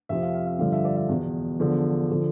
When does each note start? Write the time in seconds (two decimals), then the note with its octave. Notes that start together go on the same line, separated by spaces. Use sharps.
0.09 F2 C3 F3 E5
0.23 F5
0.34 F5
0.47 E5
0.59 G2 D3 F3 F5
0.72 E5
0.85 D5
0.97 E5
1.09 E2 B2
1.60 E2 D3 F3
2.11 D3 F3